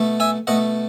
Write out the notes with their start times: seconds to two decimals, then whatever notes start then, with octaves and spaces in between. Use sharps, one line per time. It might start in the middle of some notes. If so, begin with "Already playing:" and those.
Already playing: B2 A3
0.20 E5 G#5
0.47 B2 A3 D#5 F#5